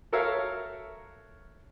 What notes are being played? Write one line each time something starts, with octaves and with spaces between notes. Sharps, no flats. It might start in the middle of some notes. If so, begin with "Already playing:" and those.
F#4 A4 A#4 C#5 E5 F5